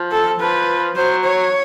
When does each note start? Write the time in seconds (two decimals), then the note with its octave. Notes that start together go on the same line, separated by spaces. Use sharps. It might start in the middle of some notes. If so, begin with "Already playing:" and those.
Already playing: F3
0.12 A4
0.40 F3 B4
0.96 F#3 C5
1.24 C#5